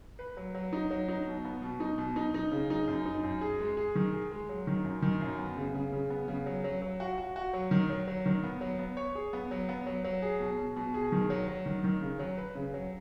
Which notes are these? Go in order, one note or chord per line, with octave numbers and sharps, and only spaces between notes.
B4
F#3
F#3
D#4
F#3
D#4
B2
B3
B2
D#4
B2
D#4
D#4
C#3
D#4
F#2
D#4
F#2
G#4
G#3
G#4
D#3
G#4
G#3
F#3
D#3
F#2
D#3
F#2
B3
C#3
C#3
C#3
B3
C#3
F#3
F#3
F#3
F#4
F#4
F#4
F#3
D#3
F#3
F#3
D#3
B3
F#3
B3
C#5
G#4
B3
F#3
B3
F#3
F#3
G#4
B2
B2
B2
G#4
D#3
F#3
F#3
D#3
D#3
C#3
F#3
B4
C#3
F#3